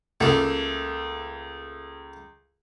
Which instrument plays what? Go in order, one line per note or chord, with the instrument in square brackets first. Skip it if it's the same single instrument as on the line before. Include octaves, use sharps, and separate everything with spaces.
[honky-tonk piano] C#2 [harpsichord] A3 A#3